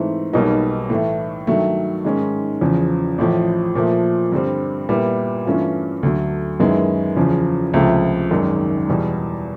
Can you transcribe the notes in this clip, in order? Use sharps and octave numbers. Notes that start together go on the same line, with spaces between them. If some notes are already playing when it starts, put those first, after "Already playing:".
Already playing: G#2 E3 A3 C4
B1 B2 G3 A#3 D#4
A2 E3 A3
G2 D#3 F#3 A3
G#2 D#3 G#3 C#4
E2 C#3 F3
A1 A2 F3
A#2 F3 A3
G2 D3 G3 C4
A#2 G3 B3 E4
G2 E3 A3 C#4 F4
D2 D3 F#3 A3
F#2 D#3 G#3 B3 E4
E2 C#3 F3
C#2 C3 F3 A3
G#1 F#2 D#3 G#3
E2 B2 G3